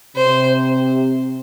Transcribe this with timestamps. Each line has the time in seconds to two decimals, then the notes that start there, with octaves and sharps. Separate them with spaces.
0.16 C3 C5